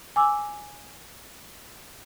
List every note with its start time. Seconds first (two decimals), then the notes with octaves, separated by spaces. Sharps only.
0.16 G#5 D6 E6